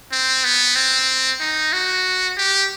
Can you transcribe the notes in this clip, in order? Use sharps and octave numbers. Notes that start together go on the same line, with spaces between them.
C4
B3
C4
D#4
F#4
G4